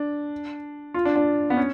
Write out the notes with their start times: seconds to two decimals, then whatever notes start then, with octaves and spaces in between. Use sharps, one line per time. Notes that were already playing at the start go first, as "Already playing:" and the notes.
Already playing: D4
0.94 F4
1.05 D4
1.16 D4
1.50 B3
1.57 C#4